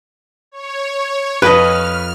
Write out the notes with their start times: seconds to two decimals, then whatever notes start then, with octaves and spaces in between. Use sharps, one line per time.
0.52 C#5
1.42 F2 B4 D#5 F6